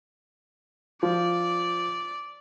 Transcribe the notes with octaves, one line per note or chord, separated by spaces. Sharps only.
F3 D5